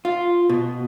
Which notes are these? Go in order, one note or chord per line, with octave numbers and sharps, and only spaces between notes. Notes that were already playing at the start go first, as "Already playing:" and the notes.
F4
B2